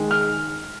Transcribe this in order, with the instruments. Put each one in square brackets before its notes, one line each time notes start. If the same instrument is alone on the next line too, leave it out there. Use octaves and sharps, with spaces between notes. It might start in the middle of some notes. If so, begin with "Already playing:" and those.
Already playing: [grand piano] D#3 G#3
F6